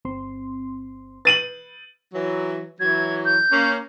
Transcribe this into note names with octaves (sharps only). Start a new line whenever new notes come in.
G1 C4 C6
B4 A6 D#7 F#7
E3 F#3
E3 F#3 G#6
G6
A#3 C#4